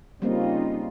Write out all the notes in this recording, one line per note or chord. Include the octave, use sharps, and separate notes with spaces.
C#3 G3 A#3 C4 D#4 F4